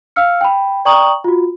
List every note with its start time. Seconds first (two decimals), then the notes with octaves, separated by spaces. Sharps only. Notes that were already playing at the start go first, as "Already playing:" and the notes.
0.16 F5 E6 F6 C#7
0.41 G5 B5
0.85 D5 G5 A#5 C#6 D#6 F#7
1.24 F4 F#4